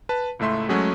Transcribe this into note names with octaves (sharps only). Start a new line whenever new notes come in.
B4 A5
C#2 A2 A3 E5 C6
F#3 G#3 A3 C#4 F#4 G#4